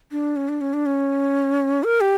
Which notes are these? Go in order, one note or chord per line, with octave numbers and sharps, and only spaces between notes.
D4
C#4
D4
C#4
D4
C#4
A#4
G4